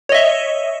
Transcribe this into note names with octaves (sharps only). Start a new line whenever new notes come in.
C#5 D#5 E5